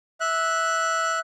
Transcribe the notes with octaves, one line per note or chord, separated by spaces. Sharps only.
E5 F#6